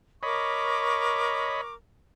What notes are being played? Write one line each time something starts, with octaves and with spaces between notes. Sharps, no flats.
A#4 C#5 D#5 B5 C#6 D6